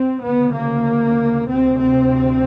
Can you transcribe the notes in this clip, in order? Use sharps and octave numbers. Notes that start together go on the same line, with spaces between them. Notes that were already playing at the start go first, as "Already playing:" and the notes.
Already playing: C4
D2 C#3 B3
A#3
D2 C3 C4
C4